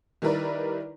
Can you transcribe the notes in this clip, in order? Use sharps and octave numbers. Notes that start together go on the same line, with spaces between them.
D#3 G3 E4 A#4 B4 D5